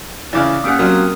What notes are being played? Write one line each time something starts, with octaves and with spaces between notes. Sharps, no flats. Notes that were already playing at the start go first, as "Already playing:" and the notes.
C#3 E3 D5 D6 F6
A#3 C#4 G4 F#5 D#6
F#3 C4 A#4 D#6 F6